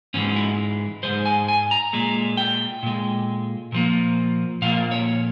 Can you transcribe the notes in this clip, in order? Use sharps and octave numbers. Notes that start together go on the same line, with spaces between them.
G#2 E3 G#3 C#4
E4
G#2 E3 G#3 C5
G#5
G#5
A#5
A#2 G#3
G5
A#2 G#3
A#2 F3 A#3
A#2 F3 A#3 F5
C#5